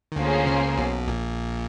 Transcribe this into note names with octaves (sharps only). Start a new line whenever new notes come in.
D#3
D2 D3 A#3 C#4 F4 G#4 C5
C#2 C#3
B1 B2
A#1 A#2